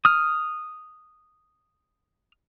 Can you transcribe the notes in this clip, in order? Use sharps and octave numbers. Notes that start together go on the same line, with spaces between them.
D#6 F6